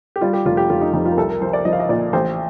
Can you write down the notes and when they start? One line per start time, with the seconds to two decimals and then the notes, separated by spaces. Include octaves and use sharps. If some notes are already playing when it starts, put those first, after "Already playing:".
0.16 G4
0.21 G3 F4
0.33 G4
0.46 F1 F4
0.57 G4
0.70 F1 F4
0.81 D#4
0.93 F2 D#4
1.06 F4
1.12 A#4
1.17 C2 A4
1.30 A#4
1.41 F3 C5
1.53 D5
1.65 F3 D#5
1.73 F5
1.80 D#5
1.89 A#2 D5
2.13 A1 C5